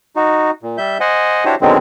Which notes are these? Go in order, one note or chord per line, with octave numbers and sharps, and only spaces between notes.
D#4 F#4
A#2
G3 E5 G6
C5 D#5 F#5 G#5
D4 E4 F#4 G4 C5 C#5
B2 D3 D#3 F#3 G#3 C4